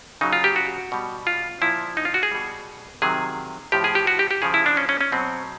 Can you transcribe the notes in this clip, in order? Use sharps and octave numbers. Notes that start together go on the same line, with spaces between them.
C#3 F#3 D#4
F4
G4
F#4
B2 G3
F4
A#2 F3 E4
D#4
F4
F#4
G#4
B2 G3
C3 D#3 F#3 G#4
A2 F3 G4
G#4
G4
F#4
G4
G4
C#3 F3 G#4
E4
D4
C#4
C#4
C#4
B2 F#3 C4